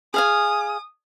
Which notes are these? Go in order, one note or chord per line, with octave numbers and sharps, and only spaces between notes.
G#4 F5 G#5 D#6